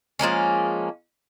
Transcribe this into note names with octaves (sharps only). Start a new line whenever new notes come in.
F3 G#3 A#3 C#4